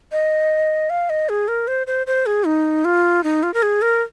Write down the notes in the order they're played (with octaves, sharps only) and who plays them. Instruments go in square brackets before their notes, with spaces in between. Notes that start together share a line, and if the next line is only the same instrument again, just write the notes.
[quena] D#5
F5
D#5
G#4
A#4
C5
C5
C5
G#4
D#4
F4
D#4
F4
A#4
G#4
A#4